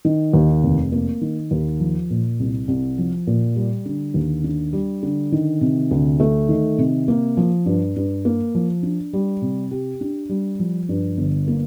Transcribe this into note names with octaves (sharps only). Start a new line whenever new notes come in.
D#3
D#2
F1
A#3
D#3
D#2
F3
A#2
C2
C2
F3
A#2
G3
D3
D#2
D4
G3
D3
D#3
C3
D2
A3
D#3
C3
A#3
F3
G2
G2
A#3
F3
D4
G3
C3
G4
D4
G3
F3
G2
G1
A#3